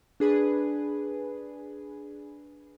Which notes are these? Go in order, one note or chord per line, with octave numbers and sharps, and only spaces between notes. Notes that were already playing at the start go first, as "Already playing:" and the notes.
D4 G#4 B4